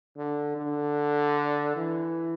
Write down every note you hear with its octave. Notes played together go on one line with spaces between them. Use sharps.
D3
D3
E3